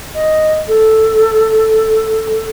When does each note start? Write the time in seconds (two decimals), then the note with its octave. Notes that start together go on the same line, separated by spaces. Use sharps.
0.14 D#5
0.68 A4